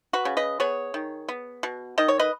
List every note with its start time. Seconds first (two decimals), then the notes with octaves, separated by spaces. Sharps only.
0.13 F#4 B4
0.25 C#3
0.37 B4 D#5
0.60 B3 G#4 C#5
0.94 D#3
1.29 B3
1.63 B2
1.98 D#3 D#5
2.08 C#5
2.19 B4 D#5